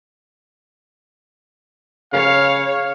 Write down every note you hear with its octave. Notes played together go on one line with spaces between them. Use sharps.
C#3 C#5 F5